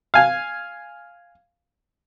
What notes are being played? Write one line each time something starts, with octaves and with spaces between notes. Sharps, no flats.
F5 G#5